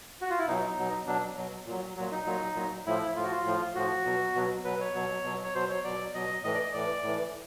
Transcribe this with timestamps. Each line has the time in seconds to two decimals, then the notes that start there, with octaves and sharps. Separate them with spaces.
0.21 F#4
0.30 F4
0.38 E4
0.47 B2 F#3 D#4
0.78 B2 F#3
1.07 B2 F#3 D4
1.37 B2 F#3
1.66 A#2 F#3
1.96 A#2 F#3
2.11 D#4
2.26 A#2 F#3
2.55 A#2 F#3
2.86 A2 F3 E4
3.16 A2 F3 F4
3.24 F#4
3.31 F4
3.45 A2 F3
3.75 A2 F3 F#4
4.05 B2 F#3
4.35 B2 F#3
4.64 B2 F#3 B4
4.80 C#5
4.95 B2 F#3
5.24 B2 F#3
5.44 C#5
5.54 B2 F#3 C5
5.70 C#5
5.84 B2 F#3 D5
6.14 B2 F#3 D#5
6.44 A2 E3 D#5
6.54 D5
6.59 D#5
6.73 A2 E3 D5
7.03 A2 E3